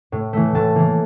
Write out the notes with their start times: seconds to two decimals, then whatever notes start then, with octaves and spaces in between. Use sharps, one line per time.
0.12 A2
0.33 E3 A3
0.55 A2 A5
0.75 E3 A#3